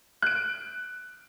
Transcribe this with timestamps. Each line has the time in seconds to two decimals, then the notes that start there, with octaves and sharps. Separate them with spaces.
0.22 F#6 D7